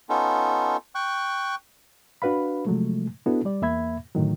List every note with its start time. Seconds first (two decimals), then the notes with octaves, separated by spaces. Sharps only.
0.09 B3 C#4 D#4 F4 A4
0.95 G5 C#6 F#6
2.22 D4 F#4 B4 F5 B5
2.66 C3 F3 F#3 G#3 A3
3.26 B3 D4 E4 F#4 A4
3.45 G3 D5
3.62 E2 A#3 E5 B5 G#6
4.15 A2 D3 D#3 F#3